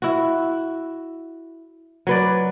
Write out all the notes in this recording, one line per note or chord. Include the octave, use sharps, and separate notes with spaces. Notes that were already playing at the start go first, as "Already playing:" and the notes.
E4 F#4
F#3 B4 D5